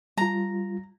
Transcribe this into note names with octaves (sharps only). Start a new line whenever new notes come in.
G3 F4 A#5